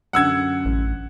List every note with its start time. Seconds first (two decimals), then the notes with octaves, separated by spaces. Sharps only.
0.13 F#2 D3 F#5 E6 G#6
0.65 A1